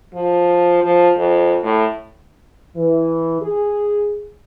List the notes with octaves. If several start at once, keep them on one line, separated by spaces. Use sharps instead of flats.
F3
F3
F2
A2
E3
G#4